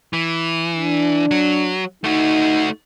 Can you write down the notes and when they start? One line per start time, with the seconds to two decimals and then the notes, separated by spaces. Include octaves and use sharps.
0.13 E3
0.77 D4
1.31 F#3
2.04 A3 D#4 F#4